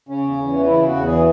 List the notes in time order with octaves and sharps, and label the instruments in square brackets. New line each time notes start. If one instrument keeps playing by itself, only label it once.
[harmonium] C#3 C#4
E2
E2
E3
C#3 E4
E2 F#4
E2
G#4
E3